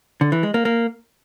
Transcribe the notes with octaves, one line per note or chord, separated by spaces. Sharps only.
D3
E3
G#3
A#3
A#3